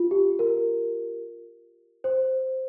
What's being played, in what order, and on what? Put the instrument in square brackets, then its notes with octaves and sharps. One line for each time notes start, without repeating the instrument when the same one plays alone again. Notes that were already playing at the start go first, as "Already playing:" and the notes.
Already playing: [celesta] F4
G4
A#4
C5